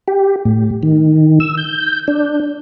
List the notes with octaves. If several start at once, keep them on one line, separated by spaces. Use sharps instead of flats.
G4
A2
D#3
E6
G6
D4